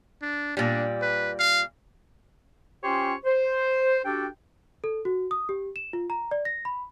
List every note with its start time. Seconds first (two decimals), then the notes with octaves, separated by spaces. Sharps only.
0.22 D4
0.57 A#2 G3 D4
1.02 B4
1.39 F5
2.84 C#4 F4 G4 C5 C#5 G5
3.25 C5
4.05 D4 F#4 G4 A4 G5
4.84 A4
5.05 F#4
5.31 D#6
5.49 G4
5.76 E7
5.93 F4
6.10 A#5
6.31 D5
6.45 A#6
6.65 B5